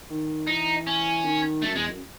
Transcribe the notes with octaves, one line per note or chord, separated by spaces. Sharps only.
D#3
E3 D#4
C#4
D#3
F#2 A3
E2 G#3
F#2